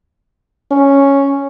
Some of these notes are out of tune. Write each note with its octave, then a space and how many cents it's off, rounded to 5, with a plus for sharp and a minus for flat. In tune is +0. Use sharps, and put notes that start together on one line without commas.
C#4 +0